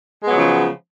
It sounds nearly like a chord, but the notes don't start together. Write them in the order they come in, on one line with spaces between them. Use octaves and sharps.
G#3 B3 F#3 C#3 F3